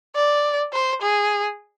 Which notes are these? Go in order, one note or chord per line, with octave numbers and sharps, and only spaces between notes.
D5
C5
G#4